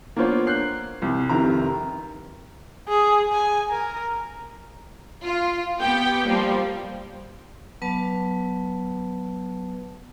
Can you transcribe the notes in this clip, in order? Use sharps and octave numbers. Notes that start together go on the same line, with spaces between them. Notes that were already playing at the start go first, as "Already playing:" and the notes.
A#3 B3 D4 F4 C5 C#5
F#6 G6 C7 F#7
C2
F1 C3 D#3 E4 A#4 A#5
G#4
G#5
A#4
F4
B3 G4 G5
F3 G3 A#3
F#3 B3 B4 A5